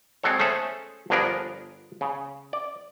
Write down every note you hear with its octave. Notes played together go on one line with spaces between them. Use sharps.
G#3 C4 F#4 A4 C#5
A3 C#4 G#4 A4 C5
G1 F3 B3 D4 G#4 A#4
C#3
D5